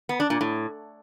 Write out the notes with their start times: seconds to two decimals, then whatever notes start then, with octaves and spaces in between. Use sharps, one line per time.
0.09 B3
0.20 D4
0.30 A#2
0.41 A2